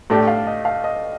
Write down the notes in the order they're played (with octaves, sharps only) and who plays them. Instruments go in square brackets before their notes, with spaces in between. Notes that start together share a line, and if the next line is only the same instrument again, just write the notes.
[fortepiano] A2 A3 D4 G4 D5
[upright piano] F5
D#5
F5
D#5